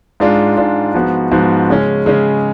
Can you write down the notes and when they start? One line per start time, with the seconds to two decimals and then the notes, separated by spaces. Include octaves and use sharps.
0.20 G#2 G#3 D4 F4
0.57 G#2 G#3 D4 F4
0.94 G#2 F3 B3 F#4
1.31 G#2 F3 B3 F#4
1.70 C#3 G#3 C#4
2.06 C#3 G#3 C#4